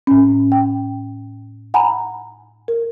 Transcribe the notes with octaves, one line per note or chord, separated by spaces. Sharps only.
A2 C#4
G5
F#5 G#5 A#5 B5
A#4